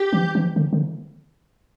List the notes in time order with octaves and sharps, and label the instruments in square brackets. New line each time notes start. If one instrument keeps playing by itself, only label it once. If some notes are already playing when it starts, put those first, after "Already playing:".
Already playing: [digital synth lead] G4
[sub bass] E3
E3
D3
D3